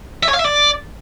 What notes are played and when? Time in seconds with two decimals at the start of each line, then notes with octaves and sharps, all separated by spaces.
0.23 E5
0.28 C#5
0.34 F5
0.40 E5
0.45 D5